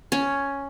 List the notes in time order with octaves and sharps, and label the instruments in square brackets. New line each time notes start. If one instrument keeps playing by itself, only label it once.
[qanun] C#4